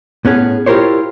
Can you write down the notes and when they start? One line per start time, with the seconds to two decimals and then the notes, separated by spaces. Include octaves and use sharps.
0.25 A2 B3 C#4 G#4
0.66 E4 F4 G4 A#4 C5 C#5